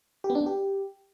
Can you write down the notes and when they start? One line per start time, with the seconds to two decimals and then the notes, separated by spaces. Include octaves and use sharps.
0.24 G4
0.30 B3
0.35 D4
0.41 B3
0.46 G4